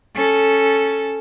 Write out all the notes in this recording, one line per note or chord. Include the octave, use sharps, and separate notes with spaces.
C#4 A4